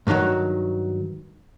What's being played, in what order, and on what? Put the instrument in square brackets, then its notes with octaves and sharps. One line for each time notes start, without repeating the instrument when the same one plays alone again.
[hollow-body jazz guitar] G2 B2 D3 D#3 F#3